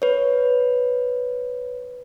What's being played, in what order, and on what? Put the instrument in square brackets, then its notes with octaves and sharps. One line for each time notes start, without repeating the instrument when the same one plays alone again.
[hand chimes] B4 C#5